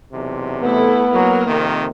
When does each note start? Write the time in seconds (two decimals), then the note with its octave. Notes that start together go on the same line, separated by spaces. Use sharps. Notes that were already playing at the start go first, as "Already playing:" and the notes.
0.13 B1 E2 C3
0.63 A3 B3 E4 A4
1.12 F#3 A#3 A#4
1.47 F2 C3 D#3